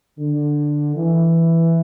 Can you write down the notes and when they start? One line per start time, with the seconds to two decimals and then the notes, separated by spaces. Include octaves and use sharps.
0.19 D3
0.95 E3